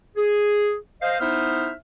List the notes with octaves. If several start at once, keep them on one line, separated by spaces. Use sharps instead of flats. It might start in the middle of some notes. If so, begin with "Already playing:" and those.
G#4
C5 D#5 F5
B3 D#4 E4 C5 E5 F6